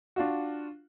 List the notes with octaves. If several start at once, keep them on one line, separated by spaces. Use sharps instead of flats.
D4 F4 F#4